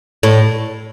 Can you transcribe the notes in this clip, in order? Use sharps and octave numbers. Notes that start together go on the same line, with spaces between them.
A2